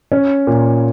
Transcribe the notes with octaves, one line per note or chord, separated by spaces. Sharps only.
C#4
A#2